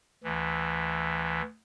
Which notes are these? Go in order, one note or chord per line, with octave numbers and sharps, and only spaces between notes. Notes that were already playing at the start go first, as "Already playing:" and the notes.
D2 E3